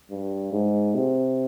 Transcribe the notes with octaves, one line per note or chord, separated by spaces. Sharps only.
G2
G#2
C3